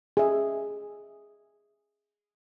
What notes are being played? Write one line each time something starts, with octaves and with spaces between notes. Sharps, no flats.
G#4 E5